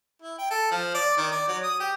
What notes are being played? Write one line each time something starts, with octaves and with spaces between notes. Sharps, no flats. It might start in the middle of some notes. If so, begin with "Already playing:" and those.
E4
G5
A4
F3
D5
D#3
D5
F#3
D#6
G4